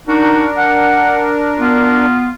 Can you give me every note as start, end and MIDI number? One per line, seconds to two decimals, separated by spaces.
0.08 2.06 62
0.08 0.45 63
0.08 0.45 66
0.08 2.06 70
0.57 1.25 78
1.59 2.29 59
1.59 2.29 65